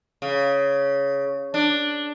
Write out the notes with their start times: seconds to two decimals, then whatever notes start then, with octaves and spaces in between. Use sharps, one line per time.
0.22 C#3
1.54 D4